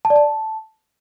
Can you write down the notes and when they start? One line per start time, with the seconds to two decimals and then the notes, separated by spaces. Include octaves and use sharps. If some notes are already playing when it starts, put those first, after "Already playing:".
0.05 A5
0.10 D5
0.16 A5